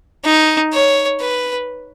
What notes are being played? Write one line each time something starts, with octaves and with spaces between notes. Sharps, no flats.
D#4
C#5
B4